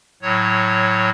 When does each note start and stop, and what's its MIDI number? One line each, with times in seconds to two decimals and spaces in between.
0.22 1.10 45
0.22 1.10 54
0.22 1.10 73